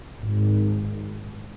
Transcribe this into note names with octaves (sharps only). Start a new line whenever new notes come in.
G#1